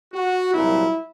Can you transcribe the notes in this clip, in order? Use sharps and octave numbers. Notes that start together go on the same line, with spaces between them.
F#4
C2 A#2 F#3 E4